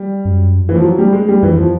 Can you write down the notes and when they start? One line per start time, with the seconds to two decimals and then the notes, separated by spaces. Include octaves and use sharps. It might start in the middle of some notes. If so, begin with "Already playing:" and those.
Already playing: G3
0.25 F#2
0.69 E3
0.76 F3
0.83 F#3
0.98 G3
1.13 G#3
1.29 G3
1.42 F2 E3
1.57 F3